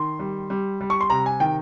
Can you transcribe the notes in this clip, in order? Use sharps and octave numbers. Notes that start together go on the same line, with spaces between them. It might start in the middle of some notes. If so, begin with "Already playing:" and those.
Already playing: D#3 C6
G3
G3
G3
C#6
C6
C3 A#5
G#5
D#3 G5